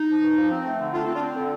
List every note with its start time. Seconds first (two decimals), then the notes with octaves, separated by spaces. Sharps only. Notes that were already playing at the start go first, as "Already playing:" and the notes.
Already playing: D#4
0.08 F3
0.22 G2
0.37 F3
0.51 C4
0.64 A3
0.79 D3
0.93 A3 D4 F4
1.04 F4 A4
1.07 C4
1.15 D4 F4
1.22 C4
1.36 D3